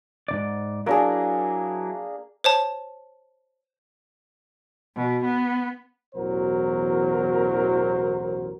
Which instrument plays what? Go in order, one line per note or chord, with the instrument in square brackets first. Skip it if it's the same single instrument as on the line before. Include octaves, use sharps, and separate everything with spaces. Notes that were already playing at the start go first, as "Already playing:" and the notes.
[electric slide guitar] G#2 C3 D5
[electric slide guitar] F#3 E4 A#4 [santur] A#3 D4 G#4
[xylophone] C5 C#5 A5
[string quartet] B2
B3
[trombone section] A1 E2 B2 F#3 A#4 C5